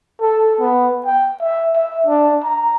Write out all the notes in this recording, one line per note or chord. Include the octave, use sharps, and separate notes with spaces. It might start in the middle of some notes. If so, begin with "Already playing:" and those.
A4
B3
G5
E5
E5
D4
A#5